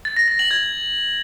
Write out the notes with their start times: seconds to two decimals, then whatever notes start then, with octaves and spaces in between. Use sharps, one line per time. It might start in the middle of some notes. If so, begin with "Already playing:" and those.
0.05 A6
0.17 A#6
0.28 A#6
0.39 F#7
0.51 G#6